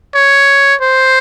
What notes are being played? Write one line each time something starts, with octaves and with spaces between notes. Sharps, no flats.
C#5
C5